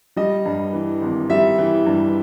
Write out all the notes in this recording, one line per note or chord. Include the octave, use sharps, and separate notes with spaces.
G3 D#5
G2
E3
G#1
G3 E5
E3
G2